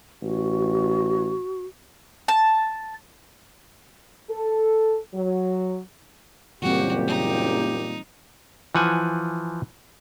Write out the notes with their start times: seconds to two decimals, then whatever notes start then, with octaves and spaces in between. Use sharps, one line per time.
0.22 A1 F#4
2.28 A5
4.30 A4
5.15 F#3
6.62 F#1 A#2 E3 G3 C4 F#4 G4
7.07 D#4
8.75 E3 F3 F#5 G#5